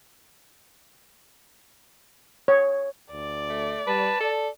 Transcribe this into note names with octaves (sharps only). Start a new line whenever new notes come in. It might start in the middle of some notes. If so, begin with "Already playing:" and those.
C#5
D2 D5
A3
G3 B4 A5
A4 D5